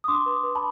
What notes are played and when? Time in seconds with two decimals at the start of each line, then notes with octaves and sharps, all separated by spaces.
0.04 D#6
0.08 D4 C6 D6
0.26 B4
0.43 B4
0.55 A5 B5